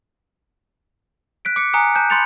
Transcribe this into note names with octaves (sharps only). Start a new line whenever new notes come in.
F#6 B6 D7
D6 C#7
G#5 A#5 D#6 F#6 C#7
A5 F#6 G6
B5 C6 G6 A6 C#7 F7